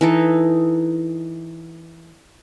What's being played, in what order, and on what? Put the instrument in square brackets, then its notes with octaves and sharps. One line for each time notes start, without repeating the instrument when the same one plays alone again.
[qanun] E3 D#4 A4